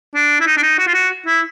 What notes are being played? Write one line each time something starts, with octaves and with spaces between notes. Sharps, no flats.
D4
E4
D#4
D4
D#4
F#4
F4
F#4
E4